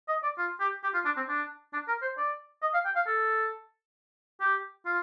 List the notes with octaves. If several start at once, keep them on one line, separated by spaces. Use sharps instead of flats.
D#5
D5
F4
G4
G4
F4
D4
C4
D4
D4
A#4
C5
D5
D#5
F5
G5
F5
A4
G4
F4